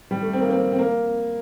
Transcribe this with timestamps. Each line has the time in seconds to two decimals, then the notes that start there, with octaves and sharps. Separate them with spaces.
0.11 G3
0.22 A3
0.33 C4
0.41 A#3
0.50 C4
0.72 C4
0.79 A#3